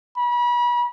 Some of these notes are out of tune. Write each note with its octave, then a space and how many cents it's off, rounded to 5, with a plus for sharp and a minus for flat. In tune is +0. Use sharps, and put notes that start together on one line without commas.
B5 -35